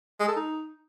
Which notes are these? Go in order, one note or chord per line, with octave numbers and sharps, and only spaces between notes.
G#3
A4
D#4